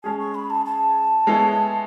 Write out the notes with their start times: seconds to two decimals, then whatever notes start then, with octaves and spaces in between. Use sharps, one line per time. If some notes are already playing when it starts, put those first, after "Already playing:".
0.04 G#3 C#4 G#4 A5
0.19 C#6
0.35 B5
0.50 A5
0.66 A5
1.27 G#3 B3 E4 A4 C#5